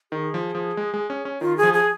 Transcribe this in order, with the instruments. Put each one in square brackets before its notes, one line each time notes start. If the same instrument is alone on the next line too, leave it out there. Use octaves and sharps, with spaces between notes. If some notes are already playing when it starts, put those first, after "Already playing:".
[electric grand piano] D#3 [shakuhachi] G#4
[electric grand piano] F3
F3
G#3
G#3
C#4
C#4
[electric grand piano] D#3 [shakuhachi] F4
[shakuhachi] G#4
[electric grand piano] F3
[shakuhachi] G#4